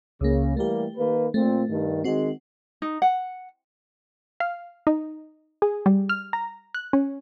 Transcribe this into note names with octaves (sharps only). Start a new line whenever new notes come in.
C#2 C#3 A#3
E3 G3 A3 A#3 G4
D#3 A#3 B4
A#2 A3 C4
G2 D#3
D#3 G#3 C4 F#4
D#4
F#5
F5
D#4
G#4
G3
F6
A#5
F#6
C#4